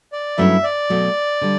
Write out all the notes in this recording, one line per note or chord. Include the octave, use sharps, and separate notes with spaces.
D5
G2 F#3 A3 C#4 E4 E5
D5
B2 F#3 A3
D3 G3